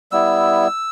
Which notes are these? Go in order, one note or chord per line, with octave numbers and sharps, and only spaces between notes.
G3 B3 E4 E6